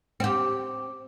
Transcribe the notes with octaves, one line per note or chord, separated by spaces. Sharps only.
C4 G4